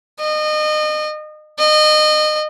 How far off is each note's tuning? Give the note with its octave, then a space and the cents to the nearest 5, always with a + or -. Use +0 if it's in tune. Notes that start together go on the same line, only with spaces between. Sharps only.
D#5 -30
D#5 -30